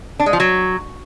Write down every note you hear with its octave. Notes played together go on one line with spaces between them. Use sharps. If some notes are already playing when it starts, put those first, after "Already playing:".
D4
G#3
F3
F#3